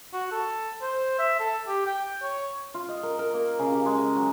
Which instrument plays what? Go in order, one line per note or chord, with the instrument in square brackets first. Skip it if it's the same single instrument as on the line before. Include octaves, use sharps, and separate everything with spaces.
[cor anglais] F#4
A4
C5
E5
A4
G4
G5
C#5
[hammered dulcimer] F4
D#5
A#4
A#4
A#3
C#3
G4
G#3
A#5
F#3